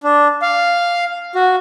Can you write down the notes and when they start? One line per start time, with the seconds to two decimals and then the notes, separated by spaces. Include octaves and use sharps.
0.03 D4
0.42 F5
1.35 F#4